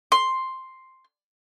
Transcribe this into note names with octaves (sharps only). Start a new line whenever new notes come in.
C6